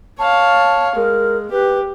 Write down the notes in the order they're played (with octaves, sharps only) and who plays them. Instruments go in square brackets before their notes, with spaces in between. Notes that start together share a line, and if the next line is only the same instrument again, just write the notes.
[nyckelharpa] C#5 F5 [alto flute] A5
[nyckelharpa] G#3 [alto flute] A#4
[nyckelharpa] G4 [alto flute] B4